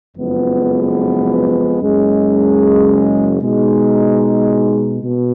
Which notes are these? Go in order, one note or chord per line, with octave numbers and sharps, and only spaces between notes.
F#1 F2 F3 G#3 B3
F#1 F#2 C#3 G#3 C#4
B2 G#3 D#4
B2